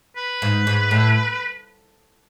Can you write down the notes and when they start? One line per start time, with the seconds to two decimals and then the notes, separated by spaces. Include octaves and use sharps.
0.17 B4
0.42 G#2
0.67 G#2
0.91 A2